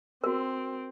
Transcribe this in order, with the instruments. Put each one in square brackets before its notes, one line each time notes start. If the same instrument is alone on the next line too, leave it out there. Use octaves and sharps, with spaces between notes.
[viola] C4 [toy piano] F#4 A#4